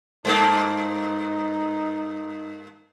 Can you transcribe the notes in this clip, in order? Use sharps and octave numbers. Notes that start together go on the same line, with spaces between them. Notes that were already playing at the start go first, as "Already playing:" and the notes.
G2 A#3 D#4 C5 G5 A5